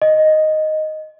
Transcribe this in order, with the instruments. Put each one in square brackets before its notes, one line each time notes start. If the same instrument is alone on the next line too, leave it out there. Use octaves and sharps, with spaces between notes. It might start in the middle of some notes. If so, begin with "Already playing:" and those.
[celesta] D#5